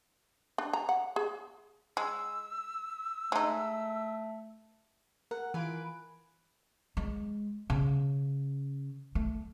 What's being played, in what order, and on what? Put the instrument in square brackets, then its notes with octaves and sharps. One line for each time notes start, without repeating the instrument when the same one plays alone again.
[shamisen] D4
A#5
F#5
G#4
[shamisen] G#3 [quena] E6
[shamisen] G#3 D#4 [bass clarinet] A3
[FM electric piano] A#4 [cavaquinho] F#5
[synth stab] E3 F4 D7 [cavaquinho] B4 G#5
[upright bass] G#3
C#3
A3